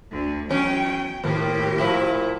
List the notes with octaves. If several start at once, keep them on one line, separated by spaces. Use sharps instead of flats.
D2 D3
E2 F#3 C#4 G5
D#2 A2 F3 A#3 G4
A#2 F3 E4